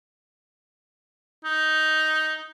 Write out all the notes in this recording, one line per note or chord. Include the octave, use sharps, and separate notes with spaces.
D#4